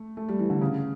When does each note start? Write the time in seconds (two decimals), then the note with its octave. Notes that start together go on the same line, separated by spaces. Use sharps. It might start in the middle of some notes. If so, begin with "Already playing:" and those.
Already playing: A3
0.17 A3
0.28 G3
0.39 E3
0.50 D3
0.61 C#3